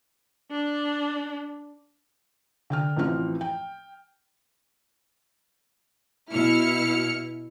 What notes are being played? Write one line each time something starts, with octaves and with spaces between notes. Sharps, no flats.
D4
D3 G5 F6
A1 E3 F3 C4 F6
G5
B2 E4 F6 C#7